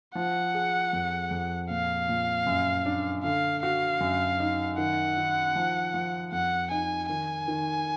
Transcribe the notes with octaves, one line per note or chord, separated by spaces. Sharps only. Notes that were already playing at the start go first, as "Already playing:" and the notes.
F3 F#5
G#4
F2
F2
A#2 F5
A#2
F#2
D4
D3 F5
F#4 F5
F#2
D#4
D#3 F#5
D#3
F3
F3
F2 F#5
D#4 G#5
D#3 G#5
D#3